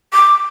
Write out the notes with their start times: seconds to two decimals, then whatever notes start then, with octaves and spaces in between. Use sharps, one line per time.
0.14 D6